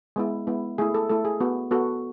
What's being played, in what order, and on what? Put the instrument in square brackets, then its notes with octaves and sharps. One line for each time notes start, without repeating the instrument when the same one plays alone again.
[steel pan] G#3 B3 E4
G#3 B3 E4
A3 E4 G#4
A4
A3 E4 A4
G#4
B3 F#4
B3 F#4 A4